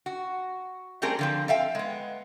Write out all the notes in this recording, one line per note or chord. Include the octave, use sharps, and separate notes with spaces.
F#4
G3 A3 C4 G4 G#4 A#4
D3 F3 C4
A4 E5 F5 G5
G#3 B3